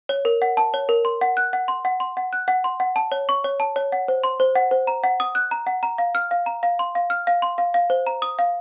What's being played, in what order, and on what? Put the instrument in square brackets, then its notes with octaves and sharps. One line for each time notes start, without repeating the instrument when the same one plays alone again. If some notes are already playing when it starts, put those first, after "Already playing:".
[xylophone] C#5
A#4
F#5
A5
C#5
A#4
C6
F#5
F#6
F#5
C6
F#5
C6
F#5
F#6
F#5
C6
F#5
A5
C#5
C#6
C#5
A5
C#5
F#5
C5
C6
C5
F#5
C5
A#5
F#5
D#6
F#6
A#5
F#5
A#5
F5
F6
F5
A#5
F5
C6
F5
F6
F5
C6
F5
F5
C5
A#5
D#6
F5